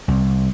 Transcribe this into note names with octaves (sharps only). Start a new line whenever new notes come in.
C2